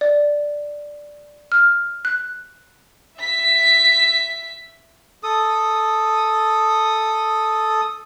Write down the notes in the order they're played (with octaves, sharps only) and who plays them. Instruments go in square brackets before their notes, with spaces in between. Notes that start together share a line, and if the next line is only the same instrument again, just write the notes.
[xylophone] D5
F6
F#6
[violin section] E5 B6
[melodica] A4 D#6